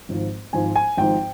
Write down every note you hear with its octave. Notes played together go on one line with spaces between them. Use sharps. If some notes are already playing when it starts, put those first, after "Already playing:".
G#1 G#2 F3
G#1 G#2 F3 G#5
G#5
G#1 G#2 F3 G5